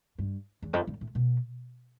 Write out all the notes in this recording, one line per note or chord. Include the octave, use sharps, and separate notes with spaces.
G2
E2
F2
G2
A2
B2